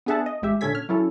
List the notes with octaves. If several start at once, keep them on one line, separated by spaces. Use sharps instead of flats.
B3 D4 G#4 E5 F#5 A5
D#5
A1 G#3 G4 E5
A#2 D3 C#4 A4 G#6 B6
F6
F#3 C#4 E4 A4